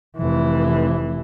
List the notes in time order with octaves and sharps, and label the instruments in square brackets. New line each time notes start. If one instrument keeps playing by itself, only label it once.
[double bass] F1 E3